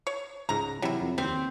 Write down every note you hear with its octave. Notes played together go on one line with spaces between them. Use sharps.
C#5
C#2 G#2 A#5
C3 E3 F#3 G3 E4
F2
D#2 G3 C4 C5